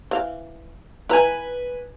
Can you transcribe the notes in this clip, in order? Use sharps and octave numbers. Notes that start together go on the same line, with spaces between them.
E3 F5
E4 B4 G#5 A#5